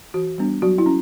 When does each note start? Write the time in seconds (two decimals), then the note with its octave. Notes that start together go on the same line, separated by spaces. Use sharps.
0.14 E3 F#4
0.38 G3 B3 D4
0.62 F#3 F#4
0.78 E4
0.86 C#4